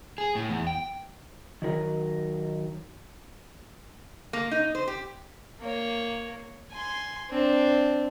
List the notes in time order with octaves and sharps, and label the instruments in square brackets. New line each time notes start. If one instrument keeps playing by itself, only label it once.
[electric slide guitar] G#4
A2
E2
G5
D#3 F#3 A#4
[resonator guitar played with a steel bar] A#3
D#4
C5
G4
[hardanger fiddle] A#3 C#5
G#5 C6
C4 D4